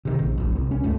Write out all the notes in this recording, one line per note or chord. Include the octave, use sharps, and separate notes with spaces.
C3 D#3
A#1
E1 A#1
C2
C#4
C#2 G#2 A3